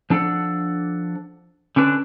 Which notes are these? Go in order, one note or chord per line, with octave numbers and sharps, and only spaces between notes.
F3 D4 A4 F#5
D3 C#4 D4 B4